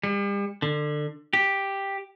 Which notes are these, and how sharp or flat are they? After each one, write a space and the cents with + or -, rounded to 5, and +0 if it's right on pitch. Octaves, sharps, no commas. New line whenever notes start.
G3 +40
D3 +25
G4 +5